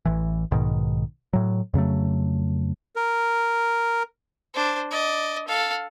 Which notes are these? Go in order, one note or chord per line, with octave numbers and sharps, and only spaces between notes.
A1 E3
B1 G#2 B2 D#3
A2 F#3
F2 C#3 F#3 A3
A#4
D4 C5
D5 D#5
A4 F5